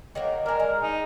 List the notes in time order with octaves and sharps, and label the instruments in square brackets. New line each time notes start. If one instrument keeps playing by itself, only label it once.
[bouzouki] D#3 F#3 A#3
[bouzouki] G#3 D4 [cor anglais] A#4
[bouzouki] G#3
[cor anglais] D#4